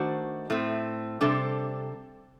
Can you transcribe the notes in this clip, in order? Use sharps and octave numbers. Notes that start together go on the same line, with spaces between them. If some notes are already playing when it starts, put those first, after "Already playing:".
Already playing: D#3 A3 D4 F#4 C5
A2 A3 C4
C3 G3 D4 A4 C5